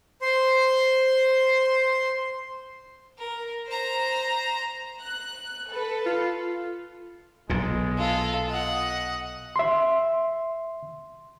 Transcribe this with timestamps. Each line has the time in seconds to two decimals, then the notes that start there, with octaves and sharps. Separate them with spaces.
0.22 C5 C6
3.18 A#4
3.67 C5 A#5
5.01 F#6
5.69 A4 B4
6.06 F4
7.50 B1 A#2 G#3
7.98 F4 A4
8.51 D#5 F#5
9.56 E5 C6